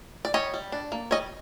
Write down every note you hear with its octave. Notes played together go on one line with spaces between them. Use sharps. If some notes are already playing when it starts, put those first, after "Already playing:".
D5
G3 C#5 D#5
G3
D4
A#3
G3 C#5 D#5